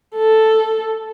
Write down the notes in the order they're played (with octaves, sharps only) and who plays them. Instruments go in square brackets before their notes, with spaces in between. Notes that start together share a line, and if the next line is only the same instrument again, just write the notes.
[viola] A4